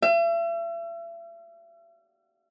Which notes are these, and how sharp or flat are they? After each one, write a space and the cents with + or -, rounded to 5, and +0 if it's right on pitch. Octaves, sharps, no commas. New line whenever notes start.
E5 +40